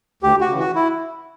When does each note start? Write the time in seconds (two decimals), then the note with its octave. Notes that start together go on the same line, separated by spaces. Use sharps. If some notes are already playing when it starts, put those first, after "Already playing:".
0.23 D2 G4
0.41 F#4
0.49 C#3 E3
0.59 F#4
0.76 E4